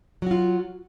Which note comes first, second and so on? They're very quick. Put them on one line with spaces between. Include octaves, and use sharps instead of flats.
F#3 F#4 F4